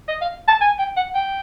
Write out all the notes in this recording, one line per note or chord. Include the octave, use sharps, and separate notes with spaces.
D#5
F5
A5
G#5
G5
F#5
G5